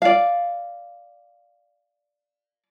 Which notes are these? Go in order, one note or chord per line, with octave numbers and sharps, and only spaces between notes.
D5 F5